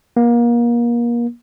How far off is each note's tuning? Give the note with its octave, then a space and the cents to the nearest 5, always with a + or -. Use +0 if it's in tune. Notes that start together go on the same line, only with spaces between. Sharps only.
A#3 +30